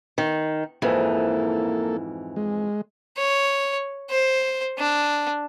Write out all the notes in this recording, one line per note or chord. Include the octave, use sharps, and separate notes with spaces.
D#3
F2 G#2 E3 A#3 A4
G#3
C#5
C5
D4